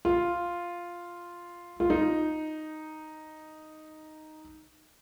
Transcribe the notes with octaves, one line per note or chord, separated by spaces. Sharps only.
F4
F4
D#4